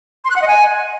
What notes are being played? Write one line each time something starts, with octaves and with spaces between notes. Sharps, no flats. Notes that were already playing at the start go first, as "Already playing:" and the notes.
C6
F#6
F#5
D#5
G#5